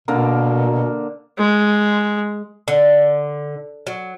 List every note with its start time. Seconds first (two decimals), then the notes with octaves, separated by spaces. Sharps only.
0.08 B2 D3 A#3 A#4
1.38 G#3
2.68 D3
3.87 F#3